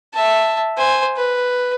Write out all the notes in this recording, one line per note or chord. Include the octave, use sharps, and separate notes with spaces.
E5 A5
C5 G#5
B4